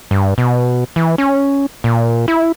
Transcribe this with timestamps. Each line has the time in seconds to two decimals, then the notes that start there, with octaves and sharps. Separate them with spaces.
0.11 G2
0.38 B2
0.96 E3
1.18 C#4
1.84 A#2
2.28 E4